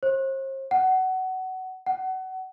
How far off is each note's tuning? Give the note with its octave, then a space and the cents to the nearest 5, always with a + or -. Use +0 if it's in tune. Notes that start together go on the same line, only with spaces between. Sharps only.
C5 +40
F#5 +20
F#5 +25